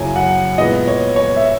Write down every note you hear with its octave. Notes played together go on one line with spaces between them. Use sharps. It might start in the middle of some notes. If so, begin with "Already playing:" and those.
Already playing: F#2 C#3 F#3 A#3 E4 G#5
F#5
A#2 G#3 B3 E4 D#5
C#5
C#5
E5